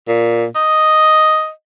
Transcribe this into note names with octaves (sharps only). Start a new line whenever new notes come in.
A#2
D#5